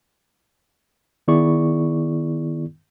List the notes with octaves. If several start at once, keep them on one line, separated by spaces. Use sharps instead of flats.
D#3 B3 E4 G#4 D5 C#6